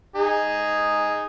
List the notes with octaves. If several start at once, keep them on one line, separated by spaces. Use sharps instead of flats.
D#4 G#4